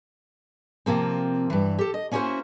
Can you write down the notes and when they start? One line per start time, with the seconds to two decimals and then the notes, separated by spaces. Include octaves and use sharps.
0.86 C3 F3 A#3 C4
1.50 G2 E3
1.79 G4 A4
1.94 D#5
2.11 A#3 C#4 D#4 E4 F#4 C5